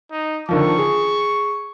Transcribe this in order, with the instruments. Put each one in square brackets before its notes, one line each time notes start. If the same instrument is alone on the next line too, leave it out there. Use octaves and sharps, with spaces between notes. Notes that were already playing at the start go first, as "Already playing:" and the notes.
[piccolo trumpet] D#4
[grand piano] D3 D#3 F3 [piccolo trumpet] C#6
[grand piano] G#4